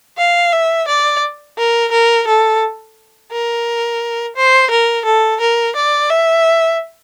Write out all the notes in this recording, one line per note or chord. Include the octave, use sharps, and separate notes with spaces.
F5
E5
D5
A#4
A#4
A4
A#4
C5
A#4
A4
A#4
D5
E5